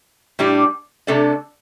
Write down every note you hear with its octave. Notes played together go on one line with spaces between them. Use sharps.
A2 G3 D4 G4
C3 A3 D4 A4 D5